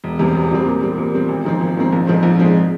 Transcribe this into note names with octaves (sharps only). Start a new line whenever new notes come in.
E1
E2 C3 G3 C4
E1
E2 C3 G3 C4
A#2
G3 C4
A#2
G3 C4
G#1
G#2 F3 C4
G#1
G#2 F3 C4
A#1
G#2 F3 G#3 C4
A#1
G#2 F3 G#3 C4